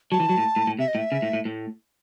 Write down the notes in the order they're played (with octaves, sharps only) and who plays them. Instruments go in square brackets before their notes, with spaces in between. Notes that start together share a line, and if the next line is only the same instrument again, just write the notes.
[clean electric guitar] F#3 [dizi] A5
[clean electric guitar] E3
F#3
A2
A2
A2
[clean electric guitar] C3 [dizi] E5
[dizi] D#5
[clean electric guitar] A2
[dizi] E5
[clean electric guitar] C#3
A2
A2
A2